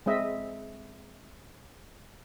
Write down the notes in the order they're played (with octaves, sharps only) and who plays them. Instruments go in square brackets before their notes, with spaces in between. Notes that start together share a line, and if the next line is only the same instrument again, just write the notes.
[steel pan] G#3 C4 D#5 E5